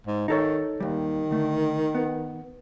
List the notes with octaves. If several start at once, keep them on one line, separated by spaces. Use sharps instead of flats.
G#2
D#3 D#4 A4 C#5
D#2 D#3 G3
D3 A3
B3